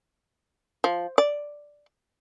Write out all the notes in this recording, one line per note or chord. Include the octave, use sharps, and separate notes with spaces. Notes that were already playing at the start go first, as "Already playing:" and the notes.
F3
D5